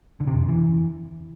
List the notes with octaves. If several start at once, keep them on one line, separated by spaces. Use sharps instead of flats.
D3
C3
F2
C#3
E3